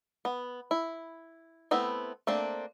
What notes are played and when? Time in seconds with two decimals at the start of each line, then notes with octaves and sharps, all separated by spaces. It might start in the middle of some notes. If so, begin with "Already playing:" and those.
0.25 B3
0.71 E4
1.71 A3 B3 C4 E4
2.27 A3 A#3 C4 D4